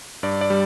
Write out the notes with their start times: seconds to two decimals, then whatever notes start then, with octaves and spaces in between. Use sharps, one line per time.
0.23 G2 D5
0.41 D5
0.50 G3